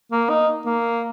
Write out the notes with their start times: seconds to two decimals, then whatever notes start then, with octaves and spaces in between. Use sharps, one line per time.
0.12 A#3
0.29 D#4
0.65 A#3